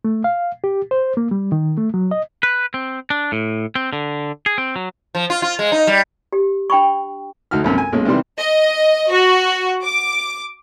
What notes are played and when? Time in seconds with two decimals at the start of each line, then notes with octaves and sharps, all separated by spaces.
0.05 A3
0.24 F5
0.64 G4
0.91 C5
1.17 A#3
1.31 G3
1.52 D#3
1.77 A3
1.94 F#3
2.11 D#5
2.43 B4
2.74 C4
3.10 D4
3.32 A2
3.75 C4
3.93 D3
4.46 G#4
4.58 C4
4.76 F#3
5.15 F3
5.30 F4
5.42 F4
5.59 G#3
5.72 D#4
5.87 G3
6.33 G4
6.70 D4 G5 B5 C#6
7.51 D2 D#4 F#4 F6
7.64 A#1 F#2 C3 A#4
7.78 G#5
7.92 B1 A#2 G#3 C#4
8.05 C3 D#3 E3 G3 C6
8.40 D#5
9.12 F#4
9.84 D6